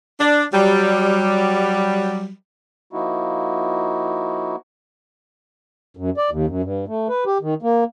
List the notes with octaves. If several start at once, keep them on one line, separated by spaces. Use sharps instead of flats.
D4
F#3 G3
F3 A#3 D#4 E4 F#4
F#2
D5
D#2
F#2
G2
A3
B4
G4
D#3
A#3